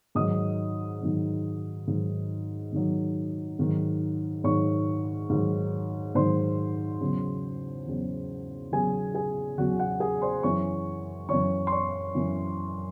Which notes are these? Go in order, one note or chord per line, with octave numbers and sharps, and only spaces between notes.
G#2 D#3 F#3 D#5 D#6
G#2 D#3 F#3
G#2 D#3 F#3
G#2 D#3 F#3
G#2 D#3 F#3
G#2 D#3 F#3 C#5 C#6
G#2 D#3 F#3
G#2 D#3 F#3 C5 C6
E2 C#3 F#3
E2 C#3 F#3
E2 C#3 F#3 G#4 G#5
G#4 G#5
E2 C#3 F#3 F#4 F#5
F#4 F#5
G#4 G#5
C5 C6
F#2 E3 C#5 C#6
F#2 E3 C#5 C#6
C6
C#5 C#6
F#2 E3